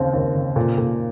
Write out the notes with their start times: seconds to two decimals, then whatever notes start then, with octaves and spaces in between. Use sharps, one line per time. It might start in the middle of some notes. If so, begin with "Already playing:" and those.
Already playing: D#2 C#3 C4
0.13 D#2
0.35 C#3
0.56 A#2
0.78 A#2